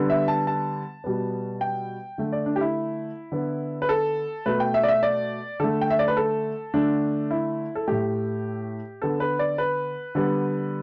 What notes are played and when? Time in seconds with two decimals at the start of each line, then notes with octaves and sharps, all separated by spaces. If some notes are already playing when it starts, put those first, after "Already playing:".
Already playing: D3 G3 B3
0.10 E5
0.28 A5
0.47 A5
1.04 B2 G3 B3
1.61 G5
2.18 D3 A3
2.33 D5
2.46 D4
2.56 G4
2.61 E4
3.32 D3 B3
3.82 B4
3.89 A4
4.46 B2 A3 B4
4.60 G5
4.74 E5
4.83 D5
4.88 E5
5.03 D5
5.60 D3 A3 A4
5.81 G5
5.90 E5
5.99 D5
6.08 B4
6.17 A4
6.74 D3 A3 D4
7.31 E4
7.75 A4
7.88 A2 A3 G4
9.02 D3 B3 A4
9.20 B4
9.39 D5
9.58 B4
10.15 D3 G3 B3